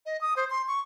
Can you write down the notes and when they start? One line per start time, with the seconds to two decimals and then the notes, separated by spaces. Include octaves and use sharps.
0.06 D#5
0.21 D#6
0.37 C5
0.50 C6
0.68 C#6